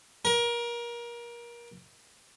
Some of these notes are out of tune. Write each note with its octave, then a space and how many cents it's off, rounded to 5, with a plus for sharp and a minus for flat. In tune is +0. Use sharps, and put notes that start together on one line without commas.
A#4 +25